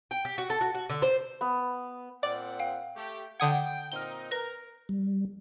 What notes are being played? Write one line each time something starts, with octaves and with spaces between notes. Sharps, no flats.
G5
G4
F#4
A4
F#4
F#4
D3
C5
B3
A#2 C4 D5 F#5
F5 G5
A3 G4
D3 F#5 G5 D#6 G#6
A#2 C4 D#4 F6 G7
A#4 B4 A#6
G3